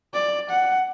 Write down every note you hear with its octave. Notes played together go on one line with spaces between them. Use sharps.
D5
F#5